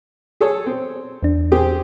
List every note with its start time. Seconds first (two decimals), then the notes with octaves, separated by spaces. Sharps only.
0.41 G#4 A4 C#5
0.66 C4
1.23 E2 D4
1.52 C4 G4 G#4